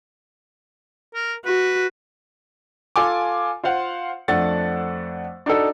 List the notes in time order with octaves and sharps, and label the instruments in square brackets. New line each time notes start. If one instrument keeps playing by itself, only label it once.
[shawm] A#4
[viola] F#4 [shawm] B4
[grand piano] F4 A4 G#5 D6
F4 C5 F5 F#5
F2 A3 D4 A4 F#5 A6
D4 D#4 F#4 A4